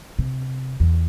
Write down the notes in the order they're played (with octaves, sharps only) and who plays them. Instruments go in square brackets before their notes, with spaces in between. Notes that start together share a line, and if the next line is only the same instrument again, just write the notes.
[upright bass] C3
E2